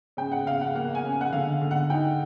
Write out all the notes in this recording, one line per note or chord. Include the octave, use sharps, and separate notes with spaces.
C#3 G5
F#5
C#3 F5
F#5
A#3 F#5
G#5
C#3
F#5
D3 F5
D3
F#5
D#4 G5